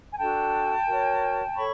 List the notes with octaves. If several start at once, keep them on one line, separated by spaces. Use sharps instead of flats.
G#5
D4 F#4 A4 G5 A5
F#4 A#4 C#5
A4 C#5 B5 C#6